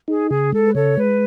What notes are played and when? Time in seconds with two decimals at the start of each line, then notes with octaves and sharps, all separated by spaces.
0.08 D#4 G#4
0.30 C#3 G#4
0.53 G#3 A4
0.66 B4
0.75 C#3 A4 C#5
0.97 G#3 B4